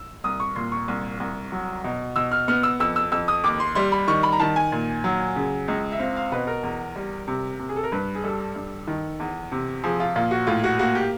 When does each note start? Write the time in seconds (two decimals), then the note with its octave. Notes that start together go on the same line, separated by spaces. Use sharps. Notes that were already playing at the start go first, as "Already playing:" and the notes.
Already playing: E6
0.24 C2 D#6
0.40 C#6
0.55 A#2 C6
0.72 C#6
0.88 C2
1.20 C2
1.52 F#3
1.84 B2
2.16 B2 E6
2.32 F6
2.48 B3 F6
2.63 E6
2.80 F2 E6
2.96 E6
3.12 F2 E6
3.28 D#6
3.44 D#2 D6
3.60 C6
3.75 G3 C6
3.92 B5
4.08 D#3 C#6
4.23 B5
4.32 A#5
4.40 D#3 A5
4.56 G#5
4.72 A#2
5.04 F#3
5.36 C#3
5.68 C#2
5.92 E5
5.99 C4 F5
6.16 F5
6.32 B2 B4
6.47 A#4
6.63 E2
6.96 G3
7.28 C3
7.59 C3
7.69 G#4
7.76 A4
7.83 A#4
7.92 G2 B4
8.15 G#4
8.24 G3 A4
8.56 G2
8.87 D#3
9.20 E2
9.52 C3
9.84 F3 G#4
10.00 F4
10.16 A#2 F4
10.31 F#4
10.47 A2 F4
10.64 F#4
10.79 A#3 F#4
10.95 G4